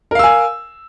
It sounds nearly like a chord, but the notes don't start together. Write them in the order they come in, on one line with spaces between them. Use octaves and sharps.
A#4 F5 E6 G#5